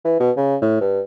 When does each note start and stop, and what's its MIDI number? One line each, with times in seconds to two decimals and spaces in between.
0.05 0.16 52
0.20 0.31 47
0.37 0.56 49
0.62 0.78 45
0.81 1.00 43